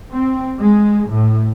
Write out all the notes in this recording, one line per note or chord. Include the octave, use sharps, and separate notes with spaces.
C4
G#3
A2